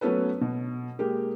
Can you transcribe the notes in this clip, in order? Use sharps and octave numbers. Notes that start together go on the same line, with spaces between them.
F#3 A3 B3 C#4 A4 B4
B2
G#3 A#3 G4